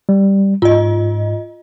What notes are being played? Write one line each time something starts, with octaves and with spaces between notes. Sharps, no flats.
G3
G#2 F4 D#5